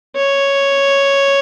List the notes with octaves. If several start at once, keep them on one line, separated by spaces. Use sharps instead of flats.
C#5